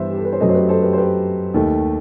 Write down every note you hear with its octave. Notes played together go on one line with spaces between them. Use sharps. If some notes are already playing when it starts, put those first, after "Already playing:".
Already playing: G2 E3 G3 B3 C5 E5
G4
A4
B4
C5
F#2 F#3 A3 B4 D#5
C5
G4 B4
A4 C5
G4 B4
C5
G4 B4
D#2 D#3 A3